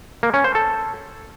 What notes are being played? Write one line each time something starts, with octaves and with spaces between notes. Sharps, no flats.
A#3
C#4
C5
A4